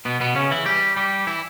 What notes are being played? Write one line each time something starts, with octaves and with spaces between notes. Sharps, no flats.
B2 B3
B2 B3
C#3 C#4
E3 E4
G3 G4
G3 G4
E3 E4